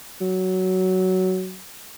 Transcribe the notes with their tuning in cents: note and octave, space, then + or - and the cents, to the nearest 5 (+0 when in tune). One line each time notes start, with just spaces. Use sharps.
F#3 +10